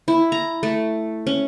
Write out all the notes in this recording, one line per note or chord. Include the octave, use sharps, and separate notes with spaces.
E4
A#5
A3
C#4